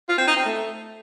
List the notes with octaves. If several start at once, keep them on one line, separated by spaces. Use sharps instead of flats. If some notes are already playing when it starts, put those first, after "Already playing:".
F4
C4
D#4
C4
A3